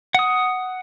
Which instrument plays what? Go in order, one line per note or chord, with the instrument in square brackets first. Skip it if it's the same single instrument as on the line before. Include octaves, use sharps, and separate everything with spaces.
[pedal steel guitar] F#5 D#6